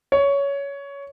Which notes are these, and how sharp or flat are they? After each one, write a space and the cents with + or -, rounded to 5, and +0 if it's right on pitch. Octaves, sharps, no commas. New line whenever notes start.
C#5 +15